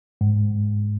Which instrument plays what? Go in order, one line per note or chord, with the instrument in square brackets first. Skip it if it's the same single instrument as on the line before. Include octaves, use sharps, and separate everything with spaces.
[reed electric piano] G#2